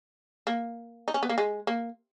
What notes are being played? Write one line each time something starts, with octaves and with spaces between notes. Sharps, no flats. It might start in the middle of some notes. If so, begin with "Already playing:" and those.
A#3
D#4
C#4
B3
A#3
G#3
A#3